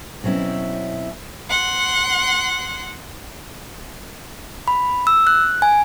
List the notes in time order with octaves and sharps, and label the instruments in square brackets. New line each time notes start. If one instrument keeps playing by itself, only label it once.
[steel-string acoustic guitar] B2 F#3 C4 C#4 E4
[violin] F#5 C6
[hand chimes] B5
E6
F#6
G#5